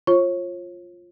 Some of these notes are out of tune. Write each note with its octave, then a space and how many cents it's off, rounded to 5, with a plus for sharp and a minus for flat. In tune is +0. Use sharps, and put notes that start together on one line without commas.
F4 +0 C#5 -40 C#6 +5